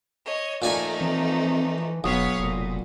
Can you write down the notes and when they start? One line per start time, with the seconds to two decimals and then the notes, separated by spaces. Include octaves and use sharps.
0.24 C#5 D#5
0.62 A#2 F3 A3 D#4 D5 G#5
1.01 E3 C4
2.04 E1 B1 B3 C#5 F5 D#6
2.39 F1 A#2